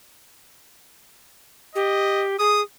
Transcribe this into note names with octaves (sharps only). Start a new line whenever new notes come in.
G4 D#5
G#4 D#6